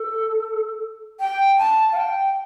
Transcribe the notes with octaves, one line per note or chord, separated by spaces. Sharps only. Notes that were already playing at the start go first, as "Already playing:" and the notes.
Already playing: A4
G5
A5
F5
G5